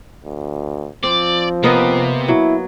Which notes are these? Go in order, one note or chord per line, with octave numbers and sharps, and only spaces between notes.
D2
F3 C4 D5
C3 A#3 B3 D#5
F#3 E4